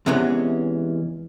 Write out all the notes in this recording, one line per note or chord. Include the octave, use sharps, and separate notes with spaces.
E2 C3 E3 G#3 B3 C#4